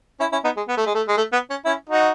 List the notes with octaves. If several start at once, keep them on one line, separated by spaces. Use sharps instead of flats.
C#4 E4
C#4 E4
B3 D#4
G#3
B3
A3
G#3
A3
G#3
A3
B3
C#4
C#4 E4
D#4 F#4